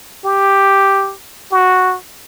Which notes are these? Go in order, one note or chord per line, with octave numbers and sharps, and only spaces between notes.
G4
F#4